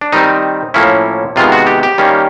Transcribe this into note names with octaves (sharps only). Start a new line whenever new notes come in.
D4
D#3 G3 C4 D#4
A2 F3 A#3 C#4 E4
C3 D#3 G#3 B3 F4
F#4
G4
G4
D#3 G3 A#3 C#4